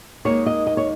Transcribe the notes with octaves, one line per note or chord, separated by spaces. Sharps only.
D#2 D#3 G#3 C#5
D#5
D#5
C#5